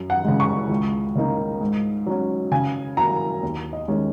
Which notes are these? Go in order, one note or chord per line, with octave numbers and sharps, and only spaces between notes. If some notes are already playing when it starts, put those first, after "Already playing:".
Already playing: F#2
F#5
C#3 G#3
C#6
C#2
C#3 A#3 D#4
G#2
F#3 C#4
C#3 G#5
F#3 A#3 A#5
D#2
D#5
D#3 G#3 C#4